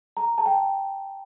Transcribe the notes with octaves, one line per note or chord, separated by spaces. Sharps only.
A#5
A5
G5